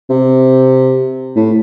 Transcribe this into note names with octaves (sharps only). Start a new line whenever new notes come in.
C3
A2